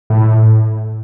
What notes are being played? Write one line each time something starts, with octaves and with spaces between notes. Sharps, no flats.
A2